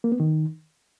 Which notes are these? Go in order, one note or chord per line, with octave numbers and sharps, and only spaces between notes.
A#3
B3
D#3